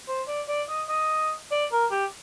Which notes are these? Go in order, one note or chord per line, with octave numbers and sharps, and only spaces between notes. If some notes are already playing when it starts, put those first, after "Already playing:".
C5
D5
D5
D#5
D#5
D5
A#4
G4